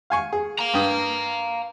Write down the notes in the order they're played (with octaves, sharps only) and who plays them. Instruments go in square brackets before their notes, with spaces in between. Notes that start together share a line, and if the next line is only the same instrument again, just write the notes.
[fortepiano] F5 G#5 C#6
G#4
[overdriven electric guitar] F5 A#5
[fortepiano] G2 G5 D#6